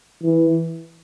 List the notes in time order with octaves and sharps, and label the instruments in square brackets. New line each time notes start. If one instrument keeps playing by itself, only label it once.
[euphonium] E3